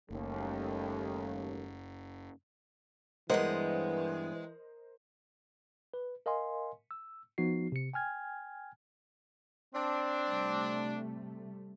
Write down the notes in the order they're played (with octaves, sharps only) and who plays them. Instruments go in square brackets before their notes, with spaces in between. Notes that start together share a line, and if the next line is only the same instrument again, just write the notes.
[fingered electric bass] F#1 [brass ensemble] D#2 [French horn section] G3 A3 C#4
[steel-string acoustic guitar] G2 B3 F#5 [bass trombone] E3 [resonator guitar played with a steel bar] G#3 [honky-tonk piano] A#4 C5 D#5
[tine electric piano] B4
A#4 D#5 F5 G#5 C6
E6
F3 B3 D#4 F#4 C7
C3 C#7
G5 G#5 F6 G#6
[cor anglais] C4 [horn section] D4
[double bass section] C3 G3 A3